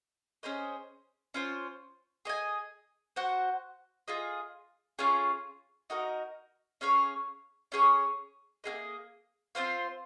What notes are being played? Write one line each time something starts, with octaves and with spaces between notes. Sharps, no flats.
C#4 G#4 C5 D#5
C#4 F4 C5
G#4 D#5 G#5
F#4 C5 F#5
F4 G#4 D#5
C#4 F4 G#4 C#5
D#4 F#4 A#4 D#5
C#4 G#4 C#5 F5
C#4 G#4 C#5
A#3 F4 G#4 D#5
C4 F4 C5 F5